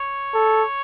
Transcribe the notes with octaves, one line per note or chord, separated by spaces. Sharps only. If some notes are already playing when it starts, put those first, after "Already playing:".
Already playing: C#5
A4